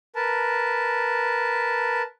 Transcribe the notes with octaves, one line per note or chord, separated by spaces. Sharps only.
A#4 B4 A5